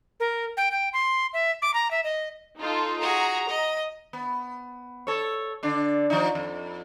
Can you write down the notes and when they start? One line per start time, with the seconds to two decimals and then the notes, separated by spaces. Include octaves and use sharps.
0.20 A#4
0.57 G5
0.72 G5
0.93 C6
1.33 E5
1.62 D6
1.74 A#5
1.91 E5
2.04 D#5
2.61 D#4 F4 A4
3.01 F#4 G#4 A#5
3.49 D#5
4.13 B3
5.07 A4 C#5
5.63 D3 D4
6.10 F3 D#4
6.35 F2